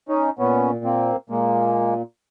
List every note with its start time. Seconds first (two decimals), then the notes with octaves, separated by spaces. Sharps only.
0.09 C#4 D#4
0.39 A#2 B3 C#4
0.84 A#3 C4
1.29 A#2 G#3 A#3